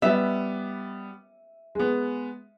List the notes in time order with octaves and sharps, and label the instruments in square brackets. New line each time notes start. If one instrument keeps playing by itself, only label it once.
[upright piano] G3 B3 [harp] E5
[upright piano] G#3 B3